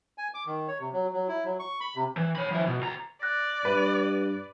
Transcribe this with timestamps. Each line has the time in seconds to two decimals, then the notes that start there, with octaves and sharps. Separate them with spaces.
0.18 G#5
0.34 D6
0.47 D#3
0.68 C#5
0.80 C3
0.93 F#3
1.13 F#3
1.28 E4
1.45 F#3
1.60 C#6
1.80 B5
1.96 C3
2.17 E3
2.36 C#5 B5
2.51 F3 E4
2.67 B2
2.81 D2 A#5
3.22 D5 F#6 A6 A#6
3.65 G2 B4